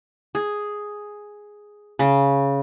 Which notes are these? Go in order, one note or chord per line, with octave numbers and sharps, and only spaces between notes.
G#4
C#3